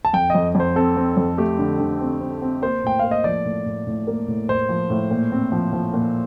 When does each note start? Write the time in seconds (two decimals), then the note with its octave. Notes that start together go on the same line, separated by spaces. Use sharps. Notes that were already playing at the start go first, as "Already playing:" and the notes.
0.05 A5
0.13 F2 G5
0.30 F2 D#5
0.55 F2 C5
0.76 C4 A4
0.97 C4
1.17 F2
1.38 A3 G4
1.59 D3
1.79 D3
2.01 C4
2.20 C4
2.42 C4
2.62 A#3 C5
2.84 A2 G5
2.99 A#3 F5
3.11 D#5
3.24 F3 D5
3.45 A2
3.66 A2
3.87 A2
4.07 A#3
4.28 A2
4.49 A2 C5
4.69 F3
4.90 A2
5.11 A#2
5.32 C4
5.52 F3
5.73 F3
5.94 A#2